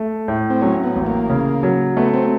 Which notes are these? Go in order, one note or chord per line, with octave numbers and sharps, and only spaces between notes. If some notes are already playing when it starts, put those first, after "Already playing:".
Already playing: A3
A2
C4
F#3 C#4
B3
A1
A#3
C#3
F#3
A3 B3
C4